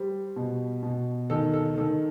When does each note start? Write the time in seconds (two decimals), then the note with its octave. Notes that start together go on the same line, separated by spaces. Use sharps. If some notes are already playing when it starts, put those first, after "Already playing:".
Already playing: G3 C5
0.36 B2
0.83 B2
1.30 D#3 A4
1.54 A4
1.78 D#3 A4